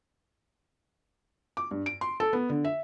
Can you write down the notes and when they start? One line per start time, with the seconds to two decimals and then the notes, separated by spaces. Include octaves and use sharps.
1.57 D6
1.71 G2
1.86 D7
2.01 C6
2.20 A4
2.33 B3
2.50 D3
2.65 E5